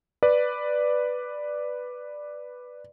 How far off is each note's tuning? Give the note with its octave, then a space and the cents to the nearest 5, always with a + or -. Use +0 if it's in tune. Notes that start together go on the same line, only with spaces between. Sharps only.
B4 +0 D5 +5